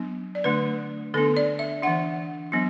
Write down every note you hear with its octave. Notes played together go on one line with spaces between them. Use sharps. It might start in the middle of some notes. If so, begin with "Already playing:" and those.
Already playing: F#3 B3 D4
D5
D3 A3 D4 B4
D3 B3 D4 A4
D5
E5
E3 D4 F#5
F#3 B3 D4